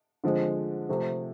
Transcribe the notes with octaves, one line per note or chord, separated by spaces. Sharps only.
D3 F3 G#3 C4
C3 F3 A3 C4